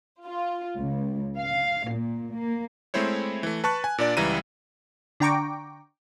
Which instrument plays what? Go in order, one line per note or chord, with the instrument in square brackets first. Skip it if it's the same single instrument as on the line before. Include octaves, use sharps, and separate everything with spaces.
[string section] F4
C#2
F5
A#2
A#3
[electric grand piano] G#3 A3 C4 E4 C5 C#5
E3 A3
B4 A5 C#6 F#6
G#5
A#2 D4 D5
C#2 E3 G3 E5 A#5 D#7
[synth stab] D3 D4 G5 A#5 C#6 D6